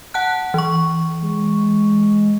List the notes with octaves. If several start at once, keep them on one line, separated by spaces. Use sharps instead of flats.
F#5 A5 F#6
E3 C#6
G#3